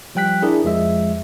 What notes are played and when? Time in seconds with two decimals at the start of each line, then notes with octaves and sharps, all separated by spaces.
0.15 F3 G3 G5 F#6 B6
0.42 D4 E4 G#4 A#4 D5
0.64 F2 F3 G#3 E5